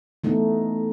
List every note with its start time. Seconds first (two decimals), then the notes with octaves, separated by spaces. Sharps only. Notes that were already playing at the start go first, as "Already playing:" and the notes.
0.24 E3 A3 B3 D#4